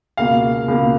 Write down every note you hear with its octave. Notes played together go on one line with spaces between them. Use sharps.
C#2 B2 A#3 F5
C#2 B2 A#3